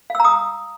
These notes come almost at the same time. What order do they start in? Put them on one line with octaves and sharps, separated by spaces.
F5 E6 A#5 D#6